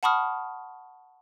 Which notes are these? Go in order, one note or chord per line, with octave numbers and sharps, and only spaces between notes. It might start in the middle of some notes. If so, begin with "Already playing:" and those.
F#5 A5 B5 C#6 D#6 F6